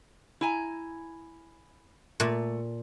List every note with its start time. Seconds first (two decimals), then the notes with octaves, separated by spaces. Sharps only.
0.41 E4 G#5 A#5
2.20 A#2 A3